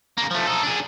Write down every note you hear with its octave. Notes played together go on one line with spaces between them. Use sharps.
C#3 A#3
F3 A3
D#4 A4
D4 G#4